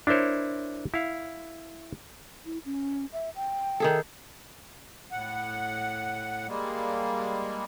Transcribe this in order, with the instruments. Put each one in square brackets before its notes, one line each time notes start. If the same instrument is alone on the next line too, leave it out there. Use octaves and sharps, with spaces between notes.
[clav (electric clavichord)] D4 E4 A#4 C5 C#5
E4 F5
[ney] E4
C#4
E5
G5
[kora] D#3 G#4 A4
[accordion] A2 F#5
G3 G#3 A#3